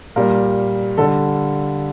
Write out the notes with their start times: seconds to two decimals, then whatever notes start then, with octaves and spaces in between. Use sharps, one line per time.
0.16 A#2 G3 A#4
0.98 D3 G3 A4